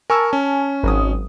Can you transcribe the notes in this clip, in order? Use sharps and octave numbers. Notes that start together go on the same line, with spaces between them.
A#4 G#5 A5 C#6 E6
C#4
G#1 F#3 D#6